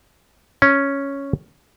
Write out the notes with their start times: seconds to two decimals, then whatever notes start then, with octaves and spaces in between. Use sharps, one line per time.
0.62 C#4